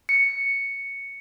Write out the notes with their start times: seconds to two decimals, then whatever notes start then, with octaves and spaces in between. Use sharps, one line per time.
0.09 C#7